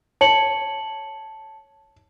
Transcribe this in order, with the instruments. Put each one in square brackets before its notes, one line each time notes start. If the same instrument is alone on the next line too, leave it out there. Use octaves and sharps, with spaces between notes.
[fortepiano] C#5 [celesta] A5 C#7 F#7